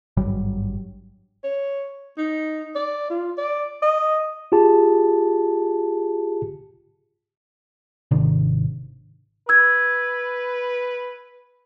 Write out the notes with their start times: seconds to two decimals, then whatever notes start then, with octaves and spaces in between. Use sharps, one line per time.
0.17 G#1 G2 F#3 G3
1.44 C#5
2.17 D#4
2.75 D5
3.10 F4
3.38 D5
3.82 D#5
4.52 F4 G4 G#4 A5
8.11 G#1 C3 D#3 D4
9.49 B4 E6 G#6